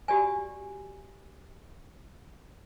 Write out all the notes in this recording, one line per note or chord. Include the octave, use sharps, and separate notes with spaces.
F#4 G4 D5 G#5